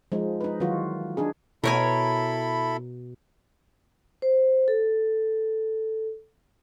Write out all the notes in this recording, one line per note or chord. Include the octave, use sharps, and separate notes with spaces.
F3 G#3 D#4
D#4 B4
D#3 E3 F#3 F4 F#4
D4 D#4 G#4
B2 E4 A4 A#4 C#5 G#5 B5
C5
A4